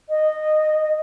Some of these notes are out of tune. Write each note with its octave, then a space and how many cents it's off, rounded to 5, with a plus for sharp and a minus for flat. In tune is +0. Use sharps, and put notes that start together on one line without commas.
D#5 -15